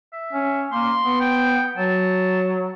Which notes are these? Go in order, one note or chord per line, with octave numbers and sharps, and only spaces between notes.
E5
C#4
A#3 C6
B3
G5
F#3 A5